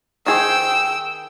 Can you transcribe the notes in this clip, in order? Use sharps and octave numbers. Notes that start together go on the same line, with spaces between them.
D#3 G#4 C5 G5 E6